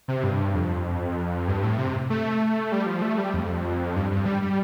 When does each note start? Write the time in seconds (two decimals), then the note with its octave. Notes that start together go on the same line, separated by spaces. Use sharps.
0.08 C3
0.24 G2
0.55 F2
1.48 G2
1.63 A2
1.78 C3
2.10 A3
2.72 G3
2.86 F3
3.02 A3
3.18 G3
3.34 F2
3.96 G2
4.11 G2
4.26 G3
4.42 G3